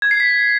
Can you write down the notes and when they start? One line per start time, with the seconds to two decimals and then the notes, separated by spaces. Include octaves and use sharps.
0.02 G#6
0.11 C7
0.20 B6